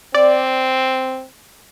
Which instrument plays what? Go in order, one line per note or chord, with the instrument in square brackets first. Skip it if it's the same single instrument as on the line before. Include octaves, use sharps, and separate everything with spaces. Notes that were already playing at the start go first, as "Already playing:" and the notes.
[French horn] C4 [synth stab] D5